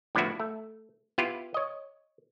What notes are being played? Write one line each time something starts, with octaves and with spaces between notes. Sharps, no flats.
A2 D3 F3 B3 E4 F#4
A3
B3 E4 F4 G4
C#5 D#5